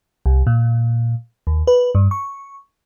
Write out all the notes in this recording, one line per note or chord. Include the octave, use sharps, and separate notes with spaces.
C2
A#2
D#2
B4
G2
C#6